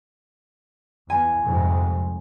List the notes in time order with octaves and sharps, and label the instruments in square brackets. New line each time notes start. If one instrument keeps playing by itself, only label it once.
[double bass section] E2 [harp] G#5
[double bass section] C2 F2 G#2